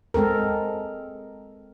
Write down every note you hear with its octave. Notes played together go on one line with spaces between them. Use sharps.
G#3 C4 A4 A#4